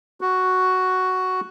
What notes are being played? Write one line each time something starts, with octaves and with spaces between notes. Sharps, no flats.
F#4